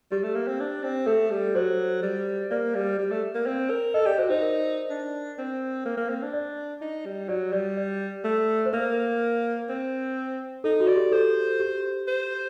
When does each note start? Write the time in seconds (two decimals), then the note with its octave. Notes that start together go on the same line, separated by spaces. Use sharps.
0.11 G3 G4
0.23 A3
0.35 A#3
0.47 C4
0.60 D4
0.83 C4
1.07 A3 A4
1.31 G3
1.55 F#3 C5
2.02 G3
2.51 A#3 D5
2.75 G3
2.98 G3
3.11 A3
3.35 A#3
3.46 C4
3.70 A#4
3.94 A4 D#5
4.06 G4 D5
4.18 F#4 C5
4.29 D#4 C5
4.42 A#4
4.90 D4
5.38 C4
5.85 A#3
5.97 A#3
6.09 C4
6.22 D4
6.33 D5
6.81 D#4
7.05 G3
7.29 F#3 D5
7.52 G3 D5
7.77 D5
8.24 A3
8.66 C5
8.73 A#3 A#4
9.69 C4
10.64 D#4 A4
10.80 F#4
10.88 D5
10.96 G4
11.12 A4 C5
11.60 G4
12.08 C5